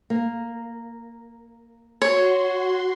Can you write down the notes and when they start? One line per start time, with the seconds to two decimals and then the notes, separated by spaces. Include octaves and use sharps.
0.10 A#3
2.02 F#4 C#5 C6